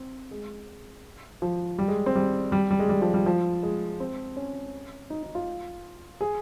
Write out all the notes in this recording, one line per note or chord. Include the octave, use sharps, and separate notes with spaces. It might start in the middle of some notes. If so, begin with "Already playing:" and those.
Already playing: C4
G#3
F3
G3
G#3
C4
G3
G3
G3
G#3
G3
F3
G3
F3
G#3
C4
C#4
D#4
D#4
F4
G#4